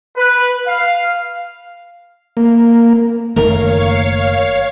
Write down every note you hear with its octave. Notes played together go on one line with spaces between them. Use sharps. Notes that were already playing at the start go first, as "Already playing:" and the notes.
B4
F5
A#3
F#1 D#3 A3 A#4 C#5 F5